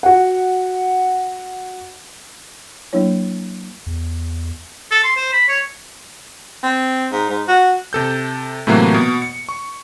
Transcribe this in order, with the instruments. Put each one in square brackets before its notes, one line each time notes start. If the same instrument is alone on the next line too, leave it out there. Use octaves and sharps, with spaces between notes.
[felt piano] F#4 F#5
[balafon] F#3 A#3 D4 E4 C#5
[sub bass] E2
[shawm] A4
C6
C5
B5
C#5
[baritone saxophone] C4
G#2
G#2
F#4
[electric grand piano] C3 A4 G6
A2 C3 E3 F#3 A3 A#3
B2
C#7
C#6